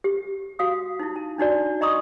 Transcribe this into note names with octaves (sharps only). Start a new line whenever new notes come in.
G4
F#4 F5 D#6
D#4 E4
A5
D4 D#4 F#4 D5
D#5 A#5 C6 C#6 D#6